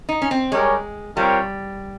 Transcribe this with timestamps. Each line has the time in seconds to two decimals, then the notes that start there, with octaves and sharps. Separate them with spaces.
0.09 D#4
0.22 C#4
0.31 C4
0.52 G3 G#3 C#4 G4 A#4 C#5
1.17 G3 C4 F4 A#4 C#5 G5